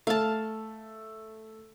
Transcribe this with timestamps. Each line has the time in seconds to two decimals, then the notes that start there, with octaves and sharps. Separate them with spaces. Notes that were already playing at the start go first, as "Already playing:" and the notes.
0.07 A3 F5 A5